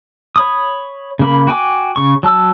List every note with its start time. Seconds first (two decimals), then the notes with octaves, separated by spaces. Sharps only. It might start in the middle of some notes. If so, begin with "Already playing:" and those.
0.36 C#5 B5 D#6
1.19 C#3 A#3 B5
1.47 F#4 G5 G#5 D6
1.96 C#3 C#6
2.23 F#3 A5 E6